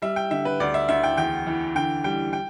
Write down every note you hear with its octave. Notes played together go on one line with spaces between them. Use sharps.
G3 E5
G5
D3 E5
B4
D2 D5
E5
D2 E5
G5
E2 G5
E3
D3 G5
G3 G5
G5